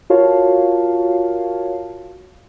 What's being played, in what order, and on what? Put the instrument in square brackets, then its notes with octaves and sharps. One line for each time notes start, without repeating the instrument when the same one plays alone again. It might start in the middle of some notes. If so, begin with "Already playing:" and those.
[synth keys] F4 F#4 A#4 C#5 F5 A5